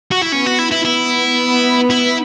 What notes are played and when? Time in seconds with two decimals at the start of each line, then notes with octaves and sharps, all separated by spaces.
0.12 F#4
0.22 E4
0.32 B3 C#4
0.46 F#4
0.59 E4
0.71 E4
0.84 B3 E4
1.90 E4